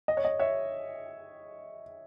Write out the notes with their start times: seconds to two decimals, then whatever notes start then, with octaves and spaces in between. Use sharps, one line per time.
0.08 D#5
0.17 C#5
0.25 D#5
0.39 C#5 E5